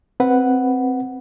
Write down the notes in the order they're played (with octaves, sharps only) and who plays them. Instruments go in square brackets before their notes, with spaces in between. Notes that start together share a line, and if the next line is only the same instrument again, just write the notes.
[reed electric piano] C4 B4 F#5